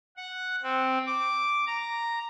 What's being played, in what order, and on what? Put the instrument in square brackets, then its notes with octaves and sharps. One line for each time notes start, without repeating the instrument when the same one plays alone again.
[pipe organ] F#5
C4
D6
A#5